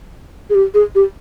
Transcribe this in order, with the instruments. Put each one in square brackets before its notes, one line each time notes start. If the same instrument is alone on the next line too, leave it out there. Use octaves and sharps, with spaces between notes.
[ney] G#4
G4
G#4
G4